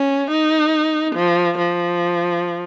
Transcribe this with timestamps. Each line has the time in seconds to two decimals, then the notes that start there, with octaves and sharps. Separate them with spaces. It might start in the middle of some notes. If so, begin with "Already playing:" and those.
Already playing: C#4
0.30 D#4
1.15 F3
1.58 F3